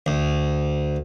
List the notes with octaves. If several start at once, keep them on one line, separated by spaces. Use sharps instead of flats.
D2